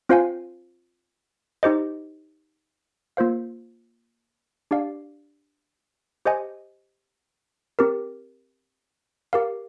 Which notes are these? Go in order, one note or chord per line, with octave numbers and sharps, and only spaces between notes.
C4 F4 C5 F5 G#5
D#4 G4 C5 D#5
A#3 F4 C5 F5
D4 G4 D5 F5
G4 C5 D#5 G#5
C4 G4 A#4
G4 A#4 F5